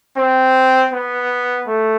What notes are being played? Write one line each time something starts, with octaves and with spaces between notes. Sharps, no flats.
C4
B3
A3